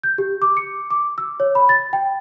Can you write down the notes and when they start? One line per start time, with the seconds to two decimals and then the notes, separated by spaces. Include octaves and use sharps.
0.03 G6
0.18 G4
0.42 D6
0.57 C#7
0.91 D6
1.18 E6
1.40 C#5
1.55 B5
1.69 A6
1.93 G5